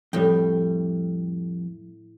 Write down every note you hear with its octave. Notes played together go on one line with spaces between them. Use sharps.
F2 A2 G3 G5